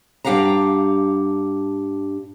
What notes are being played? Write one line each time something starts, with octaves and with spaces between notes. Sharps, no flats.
G2 D4 G4 F5 F#5 A#5